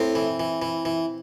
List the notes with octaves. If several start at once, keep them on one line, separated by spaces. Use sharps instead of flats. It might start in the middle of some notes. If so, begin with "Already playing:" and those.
Already playing: A2 C4
E3
E3
E3
E3